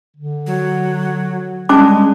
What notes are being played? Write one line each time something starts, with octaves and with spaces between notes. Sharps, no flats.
D3
F#3
G3 G#3 C#4 A5 D6